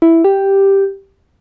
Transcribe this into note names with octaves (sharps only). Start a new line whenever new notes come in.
E4
G4